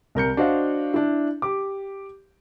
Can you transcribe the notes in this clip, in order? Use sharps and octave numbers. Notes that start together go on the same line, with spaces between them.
C2 A#4 G6 C#7
D4 F#4 C5 D#5 F5
D4 E4
G4 D6